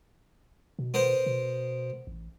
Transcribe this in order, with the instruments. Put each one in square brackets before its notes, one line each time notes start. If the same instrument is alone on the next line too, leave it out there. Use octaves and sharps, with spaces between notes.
[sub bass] B2
[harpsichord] B3 A#4 C5
[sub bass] B2
A1